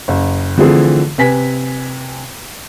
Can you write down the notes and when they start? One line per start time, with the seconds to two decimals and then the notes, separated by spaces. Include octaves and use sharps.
0.08 F#1
0.58 D3 E3 F3 A3 C4 G#4
1.18 C3 B4 G#5 B6